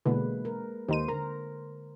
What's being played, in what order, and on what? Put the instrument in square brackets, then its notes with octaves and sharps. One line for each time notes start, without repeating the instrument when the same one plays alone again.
[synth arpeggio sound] B2 D3 E3 [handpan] G#3 A#3 B4
[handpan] A#4
[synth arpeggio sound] D#2 D#4 D#7 [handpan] C5
[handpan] D3 A#4 [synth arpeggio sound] A#5